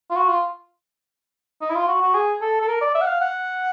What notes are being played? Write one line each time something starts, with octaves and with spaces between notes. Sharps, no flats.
F4
F#4
F4
D#4
E4
F4
F#4
F#4
G#4
A4
A4
A#4
D5
E5
F#5
F5
F#5